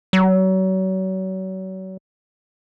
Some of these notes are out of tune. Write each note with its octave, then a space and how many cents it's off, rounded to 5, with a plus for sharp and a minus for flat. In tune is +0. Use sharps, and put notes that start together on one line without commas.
F#3 +35